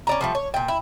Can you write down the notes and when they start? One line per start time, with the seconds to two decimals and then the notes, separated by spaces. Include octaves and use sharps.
0.07 C#4 D5 A#5
0.21 F3 G3 A3
0.35 C#5
0.54 A#2 G5
0.68 E4